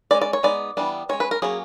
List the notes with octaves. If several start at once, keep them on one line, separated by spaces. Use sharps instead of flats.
G#3 C#4 D5
D5
C#5
G#3 B3 D#4 D5
E3 G3 B3 D4
G#3 C#4 C#5
B4
A#4
F#3 A#3 C#4 G#4